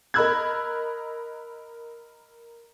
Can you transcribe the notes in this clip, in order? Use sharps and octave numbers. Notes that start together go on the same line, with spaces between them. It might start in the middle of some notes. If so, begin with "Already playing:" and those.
A#4 D#5 B5 E6 F#6 G#6